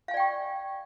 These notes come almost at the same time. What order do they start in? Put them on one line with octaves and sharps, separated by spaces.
F5 G#5 D5 G5 C#6